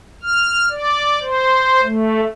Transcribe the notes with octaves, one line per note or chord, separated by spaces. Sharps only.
F6
D5
C5
A3